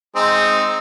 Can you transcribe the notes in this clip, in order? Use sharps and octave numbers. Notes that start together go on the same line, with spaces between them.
G#3 C4 D#4